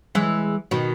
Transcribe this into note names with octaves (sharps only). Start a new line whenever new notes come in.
E3 G#3
B2 D#3